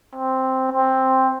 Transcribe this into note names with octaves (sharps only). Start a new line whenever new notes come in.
C4
C4